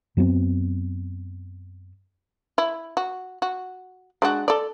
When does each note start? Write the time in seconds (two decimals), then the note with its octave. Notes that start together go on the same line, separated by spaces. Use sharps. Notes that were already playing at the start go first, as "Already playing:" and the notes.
0.17 F#2 F#3 B3 C4
2.58 E4
2.97 F#4
3.42 F#4
4.22 G#3 D4 F#4
4.48 A4 D5